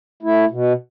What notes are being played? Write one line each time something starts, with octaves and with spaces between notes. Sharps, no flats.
A3 E4
B2